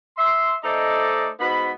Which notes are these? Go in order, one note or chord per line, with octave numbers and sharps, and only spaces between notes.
E5 C6
A3 D#4 A4 C5 D5 D#5
G#2 B3 D#4 F#4 B5